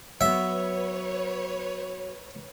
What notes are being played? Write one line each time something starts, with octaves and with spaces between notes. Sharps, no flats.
F#3 B3 B4 C#5 E5